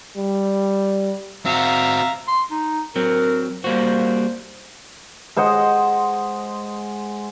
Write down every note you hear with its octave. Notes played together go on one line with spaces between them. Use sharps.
G3
C4 F#4 E5 F5 A#5
C6
D#4
F#3 C4 A#4
G3 A#3 F#4 C5
G#3 C5 D#5 F#5